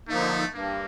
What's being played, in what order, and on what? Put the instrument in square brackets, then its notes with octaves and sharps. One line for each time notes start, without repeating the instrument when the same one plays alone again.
[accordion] D3 F3 A#3 D#4 [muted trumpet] A3
[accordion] G2 [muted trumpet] A#3